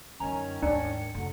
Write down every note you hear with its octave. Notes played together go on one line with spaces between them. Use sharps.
F#2 D3 D#3 C#4 G#5 A#5
D#2 G#2 D4 C#7
F1 D3 F#3